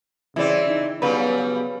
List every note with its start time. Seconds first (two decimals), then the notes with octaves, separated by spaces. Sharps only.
0.36 C#3 E3 C4 E4 D5
0.67 D#4
1.02 C#3 F#3 G3 B3 B4